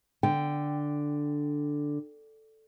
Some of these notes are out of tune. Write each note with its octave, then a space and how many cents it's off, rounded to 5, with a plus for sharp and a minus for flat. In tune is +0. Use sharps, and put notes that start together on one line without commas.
D3 +0 G5 +0